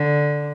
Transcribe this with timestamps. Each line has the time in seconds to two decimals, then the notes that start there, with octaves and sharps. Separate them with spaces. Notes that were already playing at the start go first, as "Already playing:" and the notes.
Already playing: D3